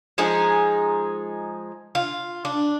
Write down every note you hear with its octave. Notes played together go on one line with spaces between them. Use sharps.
F3 G#3 D#4 G#4
F4
D4